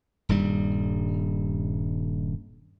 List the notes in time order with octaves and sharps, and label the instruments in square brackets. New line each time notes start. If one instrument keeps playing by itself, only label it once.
[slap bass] D#1 G2 G3